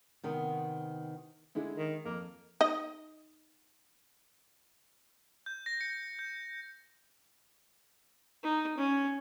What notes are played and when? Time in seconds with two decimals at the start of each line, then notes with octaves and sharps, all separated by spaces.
0.24 C3 D#3 B3
1.55 D3 G#3 E4
1.78 D#3
2.05 F2 A#3
2.61 D#4 D#5
5.46 G6
5.66 A#6
5.81 C#7
6.19 G6
8.43 D#4
8.77 C#4